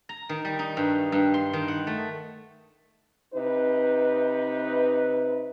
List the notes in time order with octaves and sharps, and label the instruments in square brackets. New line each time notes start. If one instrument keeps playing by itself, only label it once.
[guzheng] A#5
D#3
G3
D#4
G2
G2
C6
D#3
F#5
A3
[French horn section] C3 D#4 B4